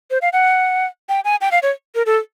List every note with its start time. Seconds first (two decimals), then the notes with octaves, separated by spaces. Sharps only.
0.11 C5
0.22 F5
0.33 F#5
1.09 G5
1.25 G#5
1.41 G5
1.52 F5
1.63 C#5
1.95 A#4
2.06 A4